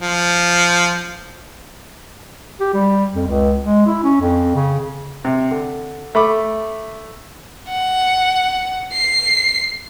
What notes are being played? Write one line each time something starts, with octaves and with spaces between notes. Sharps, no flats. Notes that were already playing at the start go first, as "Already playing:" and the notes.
F3
G4
G3
F2
C#2
G#3
E4
C#4
F2
C#3
C3
D3
A3 B5 D6
F#5
C7